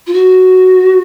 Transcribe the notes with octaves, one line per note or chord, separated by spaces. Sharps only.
F4
F#4